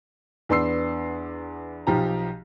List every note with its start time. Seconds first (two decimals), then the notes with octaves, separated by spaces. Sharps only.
0.49 E2 B3 D4 C6 E6 C7
1.87 B1 F3 G4 A#5